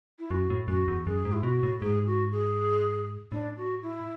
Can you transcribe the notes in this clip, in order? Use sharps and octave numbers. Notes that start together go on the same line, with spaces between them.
E4
F#2 F#4
A2
F#2 F#4
E2
F#2 G#4
G#2
E4
B2 F#4
A2
G#2 G#4
F#4
G#4
A2 D4
F#4
E4